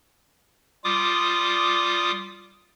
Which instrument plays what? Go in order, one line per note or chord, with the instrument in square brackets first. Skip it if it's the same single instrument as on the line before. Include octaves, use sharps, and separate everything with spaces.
[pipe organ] G3 F4 D6 D#6